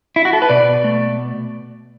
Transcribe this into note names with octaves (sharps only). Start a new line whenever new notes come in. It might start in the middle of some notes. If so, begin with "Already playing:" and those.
E4
F#4
A4
B4
B2 D5
A3